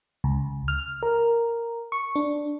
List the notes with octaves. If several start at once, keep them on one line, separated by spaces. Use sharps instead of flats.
C#2
F6
A#4
C#6
D4